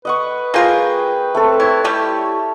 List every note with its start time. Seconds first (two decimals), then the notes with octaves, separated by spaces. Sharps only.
0.05 B4 D#5 F#5 C#6
0.54 A#3 F4 G#4 A#4 G5 G#5
1.34 A3 C4 A4
1.60 E4 C#5
1.84 G3 A3 E4 G4